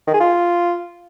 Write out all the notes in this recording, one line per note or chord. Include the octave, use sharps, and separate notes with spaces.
D#3
G#4
F4